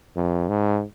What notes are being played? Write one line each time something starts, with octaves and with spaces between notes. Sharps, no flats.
F2
G#2